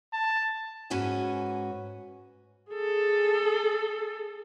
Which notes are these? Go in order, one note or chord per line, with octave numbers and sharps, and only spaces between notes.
A5
G#2 C#4 F#4 B4 G#5
G#4 A4